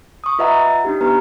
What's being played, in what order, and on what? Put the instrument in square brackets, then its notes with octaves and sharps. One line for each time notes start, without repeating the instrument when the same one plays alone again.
[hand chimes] C#6 D#6
F4 B4 D#5 E5 F#5 A#5
D4 D#4 G4
B3 G4 B4 A#5 F6